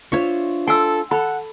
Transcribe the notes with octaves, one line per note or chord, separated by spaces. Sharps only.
D4 F4 C5 C#5 E5 C#6
A4 G#5 C6 E6
A4 F#5 B5